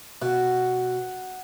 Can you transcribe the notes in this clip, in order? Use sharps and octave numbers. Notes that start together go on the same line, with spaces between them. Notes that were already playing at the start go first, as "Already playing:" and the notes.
B2 F#5